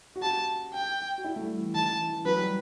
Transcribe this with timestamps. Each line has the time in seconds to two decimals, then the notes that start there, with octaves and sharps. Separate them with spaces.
0.16 F#4
0.22 G4 A5
0.73 G5
1.18 F#4
1.24 E4
1.36 A3
1.41 G3
1.58 E3
1.75 D#3 A5
1.92 E3
2.10 E3
2.26 F#3 B4
2.38 G3